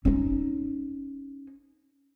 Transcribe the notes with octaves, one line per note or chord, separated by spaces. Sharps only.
C#4 D#4